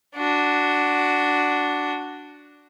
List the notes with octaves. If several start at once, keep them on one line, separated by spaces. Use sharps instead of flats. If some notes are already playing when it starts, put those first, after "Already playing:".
D4 F#4